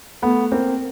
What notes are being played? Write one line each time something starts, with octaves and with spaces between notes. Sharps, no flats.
A3 B3
A#3 C4